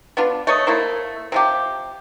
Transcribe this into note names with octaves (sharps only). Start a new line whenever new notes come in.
B3 D4 F4
A3 C#5 D#5
A3 A#3 E4 C5
C3 F3 G4